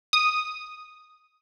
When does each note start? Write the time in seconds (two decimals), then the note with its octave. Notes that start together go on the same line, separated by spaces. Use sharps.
0.13 D#6